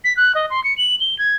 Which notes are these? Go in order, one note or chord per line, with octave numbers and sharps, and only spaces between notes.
B6
F#6
D#5
C6
C#7
F#7
G7
G#6